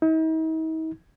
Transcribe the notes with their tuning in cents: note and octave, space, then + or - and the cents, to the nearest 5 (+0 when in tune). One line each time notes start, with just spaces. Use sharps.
D#4 +45